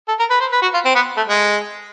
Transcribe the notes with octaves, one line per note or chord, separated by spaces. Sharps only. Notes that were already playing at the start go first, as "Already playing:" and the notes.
A4
A#4
B4
C5
B4
F#4
F4
C4
B3
A3
G#3